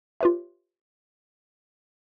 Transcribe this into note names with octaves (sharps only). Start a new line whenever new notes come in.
F4 G4 B4 C#5 E5